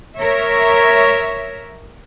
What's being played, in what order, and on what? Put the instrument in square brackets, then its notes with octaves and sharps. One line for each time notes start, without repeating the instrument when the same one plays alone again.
[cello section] A#4 C#5 E5